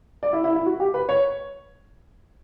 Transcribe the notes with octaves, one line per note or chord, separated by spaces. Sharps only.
D5
E4
E4
E4
F#4
G4
B4
C#5